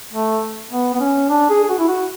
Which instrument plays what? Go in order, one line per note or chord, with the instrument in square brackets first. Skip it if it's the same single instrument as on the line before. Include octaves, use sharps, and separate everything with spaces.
[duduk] A3
B3
B3
C#4
D4
G#4
G#4
F#4
E4
F#4